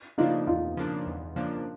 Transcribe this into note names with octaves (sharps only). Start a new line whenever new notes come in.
C#3 F3 A#3 D4 D#4 F4
E2 D#4 F4
C#3 F3 A#3 D4
E2
C#3 F3 A#3 D4